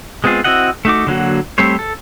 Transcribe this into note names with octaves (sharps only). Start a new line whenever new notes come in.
G#3 B3 C4 F4 G#4
C4 E4 F#4 D#5 F#5
A3 D#4 F#4 D6
D3 F#3 A#3 F#4
G3 A3 C4 C5 C#5
A4